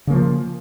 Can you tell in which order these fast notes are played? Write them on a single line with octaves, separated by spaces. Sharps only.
C#3 A#3 F3